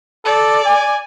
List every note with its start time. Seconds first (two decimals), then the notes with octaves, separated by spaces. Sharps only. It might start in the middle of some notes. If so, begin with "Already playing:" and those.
0.25 A4 D5
0.65 G#5